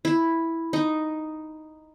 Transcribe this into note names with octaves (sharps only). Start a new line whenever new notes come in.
E4
D#4